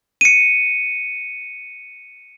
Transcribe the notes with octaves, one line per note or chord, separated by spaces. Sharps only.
C#7 D#7